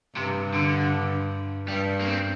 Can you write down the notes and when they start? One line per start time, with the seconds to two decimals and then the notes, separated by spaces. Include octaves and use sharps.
0.16 G2 C3
0.54 D3
1.68 G2 G3
2.01 A#3
2.07 C4